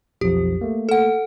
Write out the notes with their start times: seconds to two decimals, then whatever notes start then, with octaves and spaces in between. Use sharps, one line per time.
0.21 B1 F2 F3 G4
0.61 A3 A#3
0.89 A4 F#5